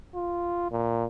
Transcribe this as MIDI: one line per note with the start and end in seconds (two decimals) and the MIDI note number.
0.15 0.71 65
0.71 1.05 46